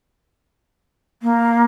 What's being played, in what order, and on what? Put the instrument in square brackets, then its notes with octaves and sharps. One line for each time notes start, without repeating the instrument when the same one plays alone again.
[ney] A#3